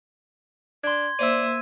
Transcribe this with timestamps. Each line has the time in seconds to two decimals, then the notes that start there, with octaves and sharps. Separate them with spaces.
0.84 D4 C6 G#6
1.19 A#3 C5 D5 E5 E6 D#7